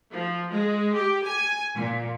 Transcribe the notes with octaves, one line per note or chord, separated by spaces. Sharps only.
F3
G#3
G4
G#5
A#2